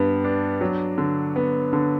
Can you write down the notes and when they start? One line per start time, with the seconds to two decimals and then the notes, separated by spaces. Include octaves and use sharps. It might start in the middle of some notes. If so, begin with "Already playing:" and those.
Already playing: G2 B3
0.24 D4
0.61 F#3
0.98 D3
1.36 B3
1.73 D3